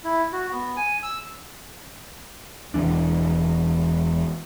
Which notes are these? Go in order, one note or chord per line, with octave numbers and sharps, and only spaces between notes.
E4
F#4
B3
G#5
E6
E1 E2 E3 D4